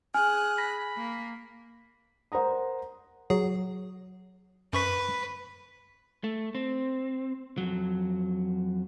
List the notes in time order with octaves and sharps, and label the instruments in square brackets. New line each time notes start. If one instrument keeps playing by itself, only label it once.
[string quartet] G#4 F#6 [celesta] G#5 [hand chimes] F6
[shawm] B5 [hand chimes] A#6
[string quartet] A#3
[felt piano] A#4 C5 F#5 A#5 D#6
[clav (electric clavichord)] F#3 [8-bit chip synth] G#4
[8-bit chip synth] F#2 C#6 B6 [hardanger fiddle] B4
[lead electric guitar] A3
C4
F2 F#3